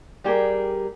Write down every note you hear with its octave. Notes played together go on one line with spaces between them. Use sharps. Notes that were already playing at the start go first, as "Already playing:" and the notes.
G3 G4 G#4 A#4